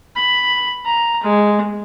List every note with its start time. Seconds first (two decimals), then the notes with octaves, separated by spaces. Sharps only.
0.16 B5
0.86 A#5
1.23 G#3